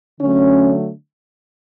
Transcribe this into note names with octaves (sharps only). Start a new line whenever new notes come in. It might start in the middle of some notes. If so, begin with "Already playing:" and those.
D3 F#3 A3 C#4